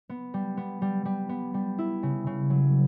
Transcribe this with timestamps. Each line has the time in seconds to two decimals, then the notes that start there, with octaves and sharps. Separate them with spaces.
0.09 B3
0.34 G3
0.57 B3
0.82 G3
1.05 G3
1.29 B3
1.54 G3
1.78 E4
2.03 C#3
2.27 C#3
2.50 F#3